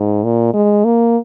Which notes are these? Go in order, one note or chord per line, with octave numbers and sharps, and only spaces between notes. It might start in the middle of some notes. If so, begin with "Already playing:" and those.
Already playing: G#2
A#2
G#3
A#3